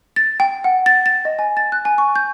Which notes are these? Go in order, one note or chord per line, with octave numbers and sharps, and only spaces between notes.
A6
G5
F#5
A6
A6
D#5
G#5
A6
F#6
G#5
C#6
G6